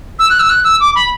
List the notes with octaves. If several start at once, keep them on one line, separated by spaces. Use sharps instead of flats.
E6
F#6
E6
F#6
E6
D6
B5